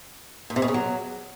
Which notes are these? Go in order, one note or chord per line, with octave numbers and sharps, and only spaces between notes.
A#2
C3
B2
C#3
F#3